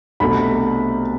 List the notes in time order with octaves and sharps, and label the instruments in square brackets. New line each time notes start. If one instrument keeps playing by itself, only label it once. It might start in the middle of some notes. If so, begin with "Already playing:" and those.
[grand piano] C2 B2 A3 D4 B5